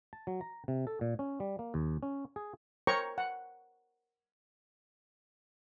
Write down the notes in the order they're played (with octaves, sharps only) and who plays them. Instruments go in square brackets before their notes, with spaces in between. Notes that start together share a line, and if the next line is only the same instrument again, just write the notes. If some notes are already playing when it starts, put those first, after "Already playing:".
[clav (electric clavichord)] A5
F#3
A#5
C3
A4
A#2
C#4
G3
A#3
D#2
C#4
G#4
[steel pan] A#4 C5 C#5 G5 A#5 C#6
F#5